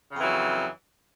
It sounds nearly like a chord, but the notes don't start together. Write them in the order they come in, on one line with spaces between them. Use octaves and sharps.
C#3 F2 E3 F#3